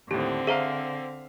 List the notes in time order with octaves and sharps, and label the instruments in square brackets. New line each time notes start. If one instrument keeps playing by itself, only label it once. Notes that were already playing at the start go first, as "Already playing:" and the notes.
[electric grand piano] D#2 A2 [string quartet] D3 C4 [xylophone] G4
[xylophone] G#4 C5 A#5 [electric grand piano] E5 F5